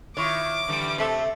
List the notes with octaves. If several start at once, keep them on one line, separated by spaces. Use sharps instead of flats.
D#3 E4 F4 C#5 D6
D3 E3 G3
C3 A3 C4 E5